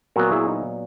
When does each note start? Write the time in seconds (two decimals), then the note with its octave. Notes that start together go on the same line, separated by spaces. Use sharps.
0.16 A#2 F#3 B3 F#4 A#4
0.32 E4 G#4
0.48 D#4